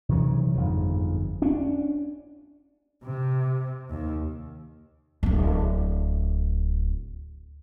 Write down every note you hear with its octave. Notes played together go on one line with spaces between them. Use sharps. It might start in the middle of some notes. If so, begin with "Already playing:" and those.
C3 D#3 E3 F#3
G1 F2 G#2
C#4 D4
C3
D#2
D1 G1